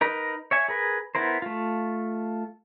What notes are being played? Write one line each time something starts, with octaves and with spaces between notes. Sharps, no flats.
D#4 A#4 B4
C#5 E5 G#5
G#4 A#4 B4
B3 E4 A#4 C5
A3 F4